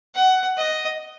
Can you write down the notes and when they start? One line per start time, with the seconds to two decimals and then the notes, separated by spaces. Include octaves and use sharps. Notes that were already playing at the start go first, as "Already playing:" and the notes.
0.15 F#5
0.57 D#5